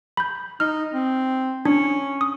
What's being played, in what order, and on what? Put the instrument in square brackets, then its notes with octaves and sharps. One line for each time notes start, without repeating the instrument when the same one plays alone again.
[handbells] B5 G6
[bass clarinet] D#4 [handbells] F6
[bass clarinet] C4
[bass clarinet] C#4 [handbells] D4
[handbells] D#6